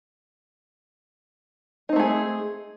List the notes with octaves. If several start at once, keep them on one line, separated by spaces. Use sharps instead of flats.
A3 C4 D#4 G#4